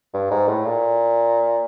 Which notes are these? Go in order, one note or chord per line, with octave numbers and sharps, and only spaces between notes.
G2
G#2
A2
A#2